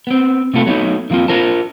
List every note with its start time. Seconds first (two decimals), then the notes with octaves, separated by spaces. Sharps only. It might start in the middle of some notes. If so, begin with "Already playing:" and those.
0.07 B3 C4
0.54 C3 A3 B3 F4 A4
0.66 F#3 A3 B3 D#4
1.10 D3 F3 A#3 C4 F4
1.28 F4 A#4 C5 A5